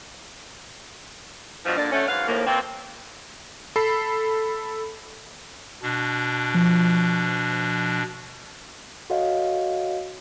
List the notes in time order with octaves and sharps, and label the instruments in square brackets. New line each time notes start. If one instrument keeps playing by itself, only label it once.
[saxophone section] G2 B2 F3
A#2 D3 A#3 D4 D5
D3 F#3 A3 C#4
G#2 F#3 B4 F5
D#2 A2 F3 A#3
B2 A#3 C4
[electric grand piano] A4 B5 C7
[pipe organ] B2 D4
[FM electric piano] F3
[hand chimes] F#4 A4 C#5 D#5 F5 F#5